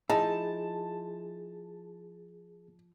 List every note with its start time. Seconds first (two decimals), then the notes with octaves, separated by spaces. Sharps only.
0.10 F3 D#4 E4 G#4 A5